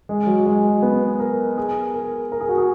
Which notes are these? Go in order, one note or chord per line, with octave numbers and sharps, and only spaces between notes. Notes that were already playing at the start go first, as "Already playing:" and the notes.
G#3
F#3
G#3
B3
A#4
G#4
A#4
A#4
G#4
F#4
G#4